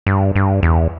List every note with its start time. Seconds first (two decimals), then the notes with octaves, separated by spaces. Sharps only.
0.07 G2
0.36 G2
0.63 E2